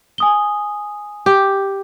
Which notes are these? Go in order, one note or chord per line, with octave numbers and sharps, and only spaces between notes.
G#5 D#6 G7
G4